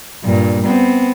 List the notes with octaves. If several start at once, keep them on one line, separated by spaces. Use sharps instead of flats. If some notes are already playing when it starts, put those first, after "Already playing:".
G2 A#2
B3 C4